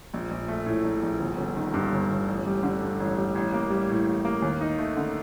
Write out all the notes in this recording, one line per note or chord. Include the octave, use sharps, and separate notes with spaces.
A#1
A#1
A3
A2
A#1
A#1
G1
G1
D#3
G2
G1
G1
A1
G3
D3
G2
A1
G3
A1
A#3
G3
A2
A1
A#3
D#2
D#4
A3
D3